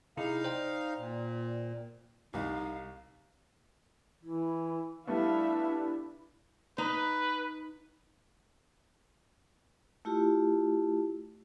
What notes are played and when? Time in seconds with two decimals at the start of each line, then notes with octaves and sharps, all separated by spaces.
0.17 C3 D#4 E4 G#4 F5
0.44 C5 D5 G5
0.98 A#2
2.34 C2 D#4 F5
4.23 E3 E4
5.07 G3 A3 B3 D4 E4 E5 F5
6.78 D#4 B4
10.05 A3 E4 F4 G4